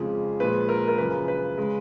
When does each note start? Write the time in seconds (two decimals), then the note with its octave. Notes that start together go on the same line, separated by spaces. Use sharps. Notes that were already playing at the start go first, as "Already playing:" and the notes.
Already playing: F2 C#3 F3 G#3 G#4
0.40 A#2 F3 G#3 B4
0.69 A#4
0.88 A#4
0.98 F#2 C#3 F3 B4
1.28 B4
1.57 C#3 G#3